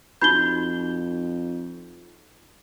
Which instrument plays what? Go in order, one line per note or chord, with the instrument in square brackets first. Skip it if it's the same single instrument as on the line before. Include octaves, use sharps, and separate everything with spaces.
[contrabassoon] F2 [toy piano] D#4 F#4 B5 [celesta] G6 G7